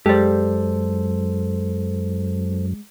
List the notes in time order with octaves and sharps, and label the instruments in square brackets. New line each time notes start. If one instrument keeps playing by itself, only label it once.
[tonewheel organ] F#2 [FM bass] G#3 [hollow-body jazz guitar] G4 D5 [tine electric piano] A4 C5